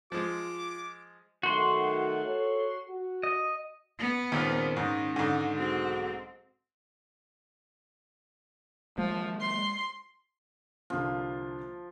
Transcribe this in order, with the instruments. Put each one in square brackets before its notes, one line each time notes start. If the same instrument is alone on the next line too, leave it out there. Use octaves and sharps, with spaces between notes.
[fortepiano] F3 G#3 [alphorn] F4 [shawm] D6
[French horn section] D#3 F#3 A3 [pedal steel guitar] F#4 C6
[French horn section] A4 C#5
F#4
[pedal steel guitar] D#5
[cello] B3
[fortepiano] D#2 A#2 [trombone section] C#3 G#3 C4
[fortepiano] G#2 [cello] D#3 [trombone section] G#3 C#4
[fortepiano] G#2 D3
[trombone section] B1 G#3 F#4 [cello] C4
[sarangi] F3 [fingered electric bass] G#3 A#3
[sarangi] C6
[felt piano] C2 D3 A#3 [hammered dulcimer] F3